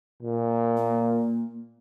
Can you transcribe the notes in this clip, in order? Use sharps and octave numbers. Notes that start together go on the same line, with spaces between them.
A#2
A#3